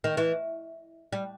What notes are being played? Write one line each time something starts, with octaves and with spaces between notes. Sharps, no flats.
D#3
E3
G3